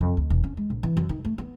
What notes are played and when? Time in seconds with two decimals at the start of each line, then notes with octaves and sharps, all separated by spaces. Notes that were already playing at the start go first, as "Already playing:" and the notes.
0.01 F2
0.17 D2
0.30 E1
0.44 C#4
0.57 G#3
0.70 A#1
0.83 E3
0.97 F#2
1.09 D#3
1.25 A3
1.38 B3